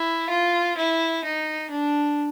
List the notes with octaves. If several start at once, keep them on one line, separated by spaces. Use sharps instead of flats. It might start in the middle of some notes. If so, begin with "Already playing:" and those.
Already playing: E4
F4
E4
D#4
D4